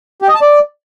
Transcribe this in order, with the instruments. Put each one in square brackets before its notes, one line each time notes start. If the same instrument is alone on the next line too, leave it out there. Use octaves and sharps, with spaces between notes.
[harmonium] G4
D#5
A5
D5